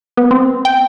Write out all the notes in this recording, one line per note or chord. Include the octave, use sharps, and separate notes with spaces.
B3
C4
G5